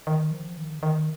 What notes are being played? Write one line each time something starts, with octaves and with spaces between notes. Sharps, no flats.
D#3
F3
D#3
C#3
D#3